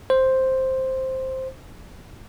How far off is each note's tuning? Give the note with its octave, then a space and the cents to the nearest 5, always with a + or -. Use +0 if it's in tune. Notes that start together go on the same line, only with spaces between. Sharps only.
C5 +5